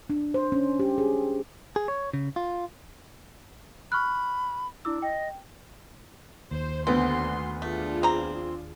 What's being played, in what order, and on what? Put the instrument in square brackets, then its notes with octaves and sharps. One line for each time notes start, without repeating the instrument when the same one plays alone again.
[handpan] D4
C5
C#4
G4
G#4
[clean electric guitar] G#4
C#5
C#3
F4
[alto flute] B5 [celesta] C#6 F6 F#6
[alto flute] D4 [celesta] E4 D6 E6
[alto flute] D#5 [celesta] G5
[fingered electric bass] D#2 [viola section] C5
[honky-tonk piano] D2 B3 [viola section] D3 C6 [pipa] C4
[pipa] A3 [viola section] D4 F4 G#4
[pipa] C4 A#5